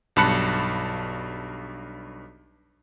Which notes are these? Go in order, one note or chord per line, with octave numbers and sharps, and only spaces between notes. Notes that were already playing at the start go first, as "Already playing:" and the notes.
B1 G2 A5 B5 F#6 C#7